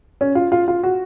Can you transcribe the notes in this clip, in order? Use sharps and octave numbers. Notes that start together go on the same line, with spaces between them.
C#4
F4
F4
F4
F#4